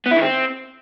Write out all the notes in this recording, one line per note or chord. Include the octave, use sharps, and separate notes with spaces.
B3
E4
D#3
C4